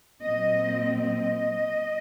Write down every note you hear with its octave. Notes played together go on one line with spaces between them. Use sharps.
A#2 F#3 C4 D#5
D#5